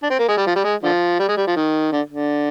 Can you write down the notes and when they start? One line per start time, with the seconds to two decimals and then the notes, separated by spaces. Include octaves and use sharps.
0.02 D4
0.10 C4
0.19 A#3
0.28 G#3
0.37 G3
0.47 F3
0.56 G3
0.64 G#3
0.83 D3 F3
1.19 G3
1.29 G#3
1.37 G3
1.47 F3
1.56 D#3
1.92 D3
2.10 D3